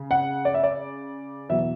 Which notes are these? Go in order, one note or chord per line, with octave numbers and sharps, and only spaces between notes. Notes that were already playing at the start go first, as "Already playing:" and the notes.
Already playing: C#3
F#5
D5
E5
D5
E2 B2 F#3 E5